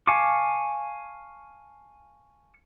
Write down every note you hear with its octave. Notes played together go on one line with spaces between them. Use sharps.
F5 G#5 A5 C#6 D6